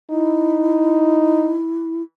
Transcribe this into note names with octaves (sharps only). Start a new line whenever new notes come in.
D#4 E4